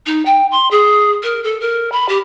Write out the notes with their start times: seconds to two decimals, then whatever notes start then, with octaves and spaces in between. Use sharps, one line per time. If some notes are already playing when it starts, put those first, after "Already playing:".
0.06 D#4
0.25 G5
0.51 C6
0.71 G#4
1.23 A#4
1.44 A4
1.60 A#4
1.92 B5
2.09 G4